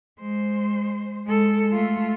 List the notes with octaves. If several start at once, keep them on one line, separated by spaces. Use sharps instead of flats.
G#3 C5
G#3 A4
A3 F4